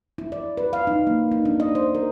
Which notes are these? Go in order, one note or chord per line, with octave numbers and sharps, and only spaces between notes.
E4
D5
B4
F5
D#4
A#3
D#4
D4
D#5
C5
A#4